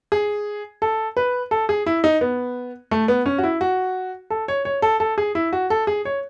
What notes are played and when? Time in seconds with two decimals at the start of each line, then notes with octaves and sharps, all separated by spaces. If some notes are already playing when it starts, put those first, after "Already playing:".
0.12 G#4
0.82 A4
1.17 B4
1.51 A4
1.69 G#4
1.86 E4
2.04 D#4
2.21 B3
2.91 A3
3.08 B3
3.26 C#4
3.38 F#4
3.44 E4
3.61 F#4
4.30 A4
4.48 C#5
4.65 C#5
4.82 A4
5.00 A4
5.18 G#4
5.35 E4
5.53 F#4
5.70 A4
5.87 G#4
6.05 C#5